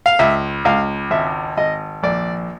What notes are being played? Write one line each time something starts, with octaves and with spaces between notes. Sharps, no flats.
F5
C#2 E5
C#2 F5
G#1 E5
G#1 D#5
A#1 D5